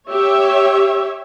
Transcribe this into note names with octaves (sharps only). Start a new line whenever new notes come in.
G4 C#5 E5